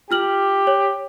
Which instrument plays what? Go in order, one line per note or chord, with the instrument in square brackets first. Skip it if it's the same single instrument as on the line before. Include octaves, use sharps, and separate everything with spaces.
[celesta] F4 F6 F#7 [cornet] G4
[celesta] C#5